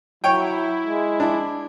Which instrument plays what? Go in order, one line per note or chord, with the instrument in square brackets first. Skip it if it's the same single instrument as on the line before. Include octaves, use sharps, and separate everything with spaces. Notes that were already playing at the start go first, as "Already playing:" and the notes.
[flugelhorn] F#3 [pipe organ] E4 [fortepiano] C#5 G5
[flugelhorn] G#3
[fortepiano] D4